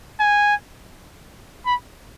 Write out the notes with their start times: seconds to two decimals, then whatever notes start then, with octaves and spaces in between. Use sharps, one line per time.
0.20 G#5
1.66 B5